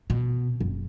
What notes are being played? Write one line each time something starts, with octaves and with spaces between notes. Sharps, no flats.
B2
F#1